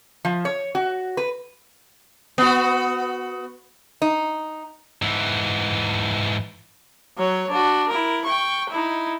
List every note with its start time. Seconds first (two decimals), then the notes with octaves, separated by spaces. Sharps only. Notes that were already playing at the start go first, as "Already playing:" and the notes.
0.25 F3
0.45 C#5
0.75 F#4
1.17 B4
2.38 B3 F#4
4.02 D#4
5.02 G#2 E3
7.18 F#3 C#5
7.50 D4 F#4
7.88 E4 A#4
8.25 G5 C#6
8.70 D#4 E4